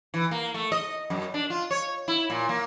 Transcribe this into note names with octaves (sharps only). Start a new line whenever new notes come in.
E3
A#3
A3
D#5
F#2
D4
F4
C#5
E4
A#2
A#3